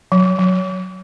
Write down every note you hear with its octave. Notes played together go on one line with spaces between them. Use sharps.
F#3
F#3